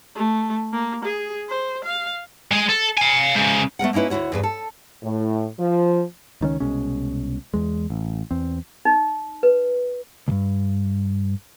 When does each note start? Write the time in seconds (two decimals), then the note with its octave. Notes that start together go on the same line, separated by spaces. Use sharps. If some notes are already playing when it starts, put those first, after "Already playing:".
0.16 A3
0.73 A#3
1.05 G#4
1.49 C5
1.85 F5
2.52 G#3 G#4
2.69 A4
2.98 F5 G#5
3.36 G#2 C#3
3.79 A3 B3 A#4 F#5
3.93 A#3 C#4 D#4 E4 B4
4.10 D2 G2 E4 F#4 C#5
4.32 E2 G2 B4
4.43 A4
5.03 A2
5.59 F3
6.41 C#2 D#3 F#3 C#4
6.60 C2 B2 G#3 C#4
7.54 E2 G#3
7.90 A1
8.31 E2 C4
8.85 D#4
9.43 B4
10.28 C#2 G2